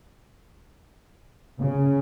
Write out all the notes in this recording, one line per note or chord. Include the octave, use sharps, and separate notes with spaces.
C#3